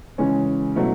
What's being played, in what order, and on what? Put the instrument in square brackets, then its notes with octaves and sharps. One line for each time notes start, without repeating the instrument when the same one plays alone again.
[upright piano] C#3 E3 G#3 C#4
B2 F#3 A3 E4